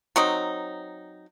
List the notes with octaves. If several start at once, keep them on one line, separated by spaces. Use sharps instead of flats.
F#3 C4 D#4